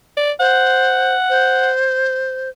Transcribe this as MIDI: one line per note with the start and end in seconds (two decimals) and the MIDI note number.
0.17 0.31 74
0.40 1.15 72
0.40 1.70 78
1.30 2.49 72